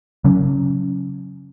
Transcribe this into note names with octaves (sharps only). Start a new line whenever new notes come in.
C#3 F#3 C#4